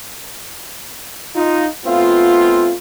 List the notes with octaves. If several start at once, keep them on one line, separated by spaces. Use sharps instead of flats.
D#4 F4
A3 B3 C4 F4